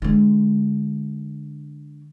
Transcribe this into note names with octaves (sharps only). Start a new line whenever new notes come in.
D3 G#3